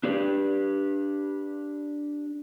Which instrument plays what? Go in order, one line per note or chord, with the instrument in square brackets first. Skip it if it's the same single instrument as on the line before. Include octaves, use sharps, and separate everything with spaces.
[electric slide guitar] D4 G4 D5